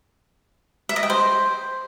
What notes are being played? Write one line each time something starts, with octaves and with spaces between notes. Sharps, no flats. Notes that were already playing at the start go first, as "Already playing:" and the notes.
E5
D#5
G5
C5